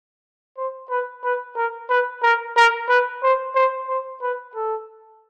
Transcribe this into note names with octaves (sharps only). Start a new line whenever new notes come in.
C5
B4
B4
A#4
B4
A#4
A#4
B4
C5
C5
C5
B4
A4